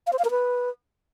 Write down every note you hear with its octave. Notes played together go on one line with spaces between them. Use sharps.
F5
C5
F5
A#4
B4